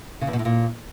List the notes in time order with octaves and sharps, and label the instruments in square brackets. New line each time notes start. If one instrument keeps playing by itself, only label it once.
[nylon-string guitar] C#3
E2
B2
A2
A#2